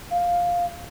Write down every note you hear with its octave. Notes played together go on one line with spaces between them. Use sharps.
F5